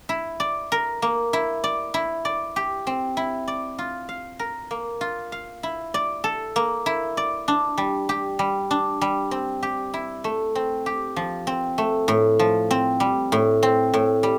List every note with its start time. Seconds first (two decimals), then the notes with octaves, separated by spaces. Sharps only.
0.09 E4
0.40 D5
0.72 A#4
1.02 A#3
1.33 E4
1.64 D5
1.94 E4
2.25 D5
2.56 G4
2.87 C4
3.17 E4
3.48 D5
3.79 F4
4.09 F5
4.39 A#4
4.71 A#3
5.01 F4
5.32 F5
5.63 E4
5.94 D5
6.24 A4
6.56 A#3
6.86 E4
7.17 D5
7.48 D4
7.78 G3
8.09 G4
8.39 G3
8.71 D4
9.01 G3
9.31 C4
9.63 G4
9.94 E4
10.24 A3
10.55 C4
10.86 G4
11.16 F3
11.47 C4
11.78 A3
12.08 A2
12.39 F3
12.71 C4
13.00 G3
13.32 A2
13.63 C4
13.94 A2
14.23 G3